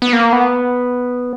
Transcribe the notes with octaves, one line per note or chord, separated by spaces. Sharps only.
B3
A#3
B3